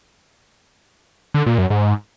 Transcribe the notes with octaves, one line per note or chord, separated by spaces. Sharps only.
D3
A#2
F#2
G#2